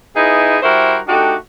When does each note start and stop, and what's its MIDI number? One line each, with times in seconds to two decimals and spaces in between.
0.16 0.57 52
0.16 0.57 59
0.16 0.57 63
0.16 0.57 64
0.16 0.57 68
0.62 0.98 55
0.62 0.98 64
0.62 0.98 66
0.62 0.98 70
0.62 0.98 72
1.08 1.34 57
1.08 1.34 62
1.08 1.34 63
1.08 1.34 66
1.08 1.34 67